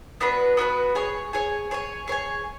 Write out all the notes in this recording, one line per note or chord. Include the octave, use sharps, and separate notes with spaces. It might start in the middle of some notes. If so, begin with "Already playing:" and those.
B3 D4 F#4 B4
B3 D4 F#4 B4
G#4 C#5 G#5
G#4 C#5 G#5
G#4 C#5 G#5
G#4 C#5 G#5